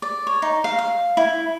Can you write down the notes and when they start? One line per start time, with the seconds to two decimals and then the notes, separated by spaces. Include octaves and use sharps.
0.02 D5
0.27 C#5
0.42 D#4
0.64 F5
0.79 F5
1.17 E4